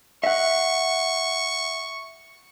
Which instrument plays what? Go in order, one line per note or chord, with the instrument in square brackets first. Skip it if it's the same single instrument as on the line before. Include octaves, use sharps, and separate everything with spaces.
[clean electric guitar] E5 F#5 [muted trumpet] C#6